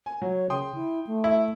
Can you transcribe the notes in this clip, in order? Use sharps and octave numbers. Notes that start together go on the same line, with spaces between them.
G#5
F#3 C#5
C#3 G5 C6 D#6
E4
A3
E4